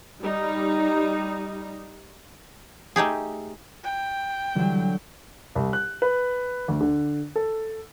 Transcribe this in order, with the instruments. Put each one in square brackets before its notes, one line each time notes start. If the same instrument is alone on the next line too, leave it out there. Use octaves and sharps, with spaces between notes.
[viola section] G3 D#4
[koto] A3 D#4 G4 G#4
[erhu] G5
[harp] D3 F#3 [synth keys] E3 G3
[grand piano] C2
F#6
B4
D2
D3
A4